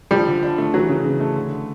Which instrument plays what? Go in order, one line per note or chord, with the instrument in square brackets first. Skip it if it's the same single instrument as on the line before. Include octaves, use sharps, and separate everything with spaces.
[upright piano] F3 [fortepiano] G3
[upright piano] D3
D4
A3
[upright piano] E3 [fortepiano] F#3
[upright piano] C#3
C#3
A3
D3